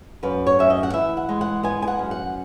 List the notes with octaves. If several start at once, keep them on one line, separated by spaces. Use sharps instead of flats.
F#2 B4
C#5
F#2 E5
D#5
F#5
E3 E5
F#5
G#3
F#5
B3 G#5
G#5
F#5
F#2
F#5